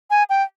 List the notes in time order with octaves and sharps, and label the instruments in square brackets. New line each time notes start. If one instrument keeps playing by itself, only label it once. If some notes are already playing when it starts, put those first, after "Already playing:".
[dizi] G#5
G5